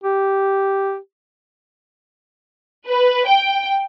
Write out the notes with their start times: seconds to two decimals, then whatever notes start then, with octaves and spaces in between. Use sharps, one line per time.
0.04 G4
2.88 B4
3.27 G5